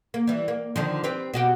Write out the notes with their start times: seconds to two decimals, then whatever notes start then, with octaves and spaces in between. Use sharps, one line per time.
0.14 A#3
0.27 E3 G3
0.48 A#3
0.76 D3 D#3 F3
1.04 C4 G4 B4
1.34 B2 F#4 G4